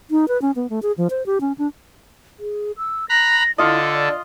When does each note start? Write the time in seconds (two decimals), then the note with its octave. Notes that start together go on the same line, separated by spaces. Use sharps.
0.11 D#4
0.28 B4
0.42 C#4
0.56 B3
0.70 A3
0.82 G#4
0.98 F3
1.10 C5
1.26 G4
1.41 C#4
1.58 D4
2.39 G#4
2.77 E6
3.09 A#5 B5 F#6 A#6
3.58 D3 E4 F4 A4 D#5
3.92 D5